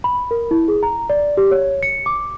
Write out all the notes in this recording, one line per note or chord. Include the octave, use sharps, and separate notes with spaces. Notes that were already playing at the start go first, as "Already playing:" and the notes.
B5
A#4
E4
G#4
A#5
D5
G4
C#5
C#7
D6